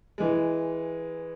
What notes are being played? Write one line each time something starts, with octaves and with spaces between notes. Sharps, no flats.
E3 G#3